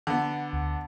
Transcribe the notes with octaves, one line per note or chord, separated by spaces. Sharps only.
D3 B3
D2